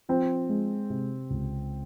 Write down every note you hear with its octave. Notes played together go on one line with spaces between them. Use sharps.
F3 C4
G#3
C3
C#2